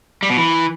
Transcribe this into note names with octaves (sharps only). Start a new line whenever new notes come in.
G3
B2
E3